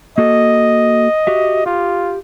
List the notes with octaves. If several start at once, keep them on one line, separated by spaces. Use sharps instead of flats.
A#3 F#4 A4 D#5
F#4 G4 E5
F4 G4